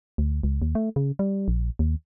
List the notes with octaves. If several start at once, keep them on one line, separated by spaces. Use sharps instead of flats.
D2
C#2
D#2
A3
C#3
G3
A#1
D#2